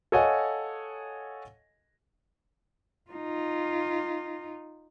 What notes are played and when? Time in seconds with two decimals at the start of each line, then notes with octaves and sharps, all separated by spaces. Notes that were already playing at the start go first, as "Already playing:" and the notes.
0.12 A4 C#5 D#5 F5 F#5 G#5
3.11 D#4 F4